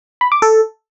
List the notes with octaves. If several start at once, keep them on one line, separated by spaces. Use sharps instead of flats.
B5
D6
A4